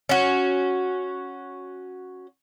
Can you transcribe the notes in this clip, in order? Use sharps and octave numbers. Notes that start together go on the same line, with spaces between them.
C#4 F#4